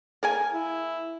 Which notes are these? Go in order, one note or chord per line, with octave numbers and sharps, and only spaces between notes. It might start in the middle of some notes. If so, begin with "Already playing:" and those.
A#3 G#4 G#5
E4